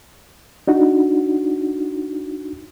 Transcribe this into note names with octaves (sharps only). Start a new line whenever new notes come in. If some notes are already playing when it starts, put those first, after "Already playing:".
D4 D#4 F#4